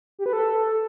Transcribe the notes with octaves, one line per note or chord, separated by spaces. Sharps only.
G4
B4
A4